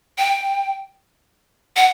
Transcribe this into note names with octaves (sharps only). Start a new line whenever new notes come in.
G5
F#5